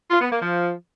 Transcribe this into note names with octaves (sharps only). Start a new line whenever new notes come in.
F4
B3
A#3
F3